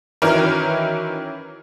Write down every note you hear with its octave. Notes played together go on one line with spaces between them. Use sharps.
D#3 E3 F#3 C#4 E4 A#4